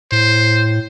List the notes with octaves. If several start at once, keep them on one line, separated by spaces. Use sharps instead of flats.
A2 C5